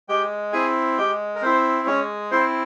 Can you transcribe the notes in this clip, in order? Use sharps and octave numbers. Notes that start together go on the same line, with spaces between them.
G#3 G4 G5
C4 E4 G#4 G#5
G#3 G4 G5
A#4
C4 E4 C5
G#3 C#4 C#5
C4 E4 C5